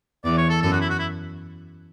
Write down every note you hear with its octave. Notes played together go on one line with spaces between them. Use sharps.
E2 D5
C#5
A4
F#2 A4
F#4
E4
F#4
E4